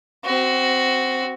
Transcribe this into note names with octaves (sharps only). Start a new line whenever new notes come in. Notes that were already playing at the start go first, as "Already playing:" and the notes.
C4 F#4